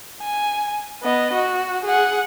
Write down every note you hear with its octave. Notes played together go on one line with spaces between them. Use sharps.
G#5
B3 D#5
F#4
G#4 F#5